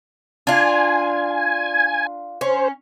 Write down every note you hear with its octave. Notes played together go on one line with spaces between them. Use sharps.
D4 F4 G#5
C#4 C5